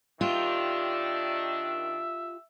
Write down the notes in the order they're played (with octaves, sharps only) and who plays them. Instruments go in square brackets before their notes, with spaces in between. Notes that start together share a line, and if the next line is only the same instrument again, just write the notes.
[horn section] D#3 D4 [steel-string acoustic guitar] F4 G4 [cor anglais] E5